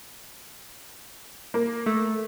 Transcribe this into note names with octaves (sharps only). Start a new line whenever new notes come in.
A#3
A3